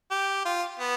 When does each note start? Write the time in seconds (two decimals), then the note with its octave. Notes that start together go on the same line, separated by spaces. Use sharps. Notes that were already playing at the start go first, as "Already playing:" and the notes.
0.11 G4
0.45 F4
0.79 B3